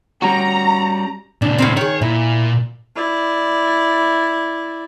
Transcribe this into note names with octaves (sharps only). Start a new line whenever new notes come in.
G3 C#4 F#4 A#5
A#2 C#3 D4
A2 A#3 C4
D#3 G#4 C#5
A#2 E4
E4 D5